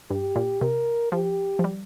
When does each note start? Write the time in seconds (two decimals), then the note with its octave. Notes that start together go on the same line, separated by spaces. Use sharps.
0.10 G2 G4
0.36 A#2
0.61 C3 A#4
1.12 F3 G4
1.59 F3
1.64 G3